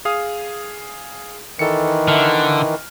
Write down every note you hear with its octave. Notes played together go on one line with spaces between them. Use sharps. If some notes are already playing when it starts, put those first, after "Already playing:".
G#4 F5 D#6
D#3 E3 A4 C#7
D3 E5 F6